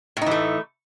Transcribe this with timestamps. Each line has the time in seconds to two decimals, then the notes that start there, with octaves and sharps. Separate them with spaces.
0.17 A2
0.22 D#4
0.26 E3
0.31 A3